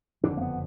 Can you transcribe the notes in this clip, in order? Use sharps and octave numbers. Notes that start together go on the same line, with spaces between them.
F#1 F2 D3 D4
A#3
B3